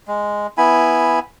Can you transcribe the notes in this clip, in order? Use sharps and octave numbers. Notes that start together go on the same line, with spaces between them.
G#3
B3 E4 G#5 B5